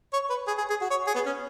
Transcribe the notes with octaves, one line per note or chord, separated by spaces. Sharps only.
C#5
B4
G#4
G#4
G#4
F#4
C#5
G#4
B3
C#4